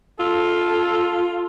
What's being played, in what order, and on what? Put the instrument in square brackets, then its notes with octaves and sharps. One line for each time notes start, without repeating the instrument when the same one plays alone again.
[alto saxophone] F4 [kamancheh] A4 [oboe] E6